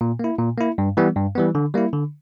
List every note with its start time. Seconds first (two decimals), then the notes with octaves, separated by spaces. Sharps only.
0.01 A#2
0.19 A#3 E4
0.39 A#2
0.58 A#3 E4
0.78 G2
0.97 E3 G3 B3
1.16 G2
1.35 E3 G3 B3
1.55 D3
1.74 G3 A#3 E4
1.93 D3